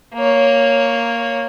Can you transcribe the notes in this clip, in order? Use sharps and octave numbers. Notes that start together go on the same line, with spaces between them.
A#3 C#5